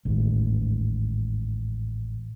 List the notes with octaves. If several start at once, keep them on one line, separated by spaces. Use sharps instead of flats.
A1 D#2 G#2